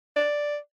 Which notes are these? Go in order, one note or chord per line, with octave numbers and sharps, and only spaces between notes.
D5